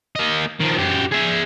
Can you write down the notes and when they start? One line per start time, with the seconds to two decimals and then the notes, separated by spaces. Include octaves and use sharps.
0.16 A#3 D#5
0.60 D#3 F3
0.77 F#2 G4
1.11 G#4 E5